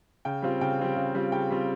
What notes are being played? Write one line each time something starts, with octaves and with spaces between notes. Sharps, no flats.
C#3 G5
G3 C4 F4
C#3 G5
G3 C4 F4
C#3
G3 C4 F4
C#3 G5
G3 C4 F4